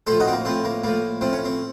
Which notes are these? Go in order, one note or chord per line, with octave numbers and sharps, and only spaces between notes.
A2 F3 A4 C5
D#4 F#4
C4
A#3
A2 F3 C4
A#3
A2 F3 A#3
A2 F3 C4
C#4
C4